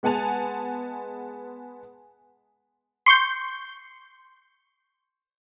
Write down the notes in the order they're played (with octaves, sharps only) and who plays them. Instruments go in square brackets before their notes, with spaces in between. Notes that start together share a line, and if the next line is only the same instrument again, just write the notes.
[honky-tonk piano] G#3 B3 F#5 G#5 A5 F7
[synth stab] C6 C#6 G6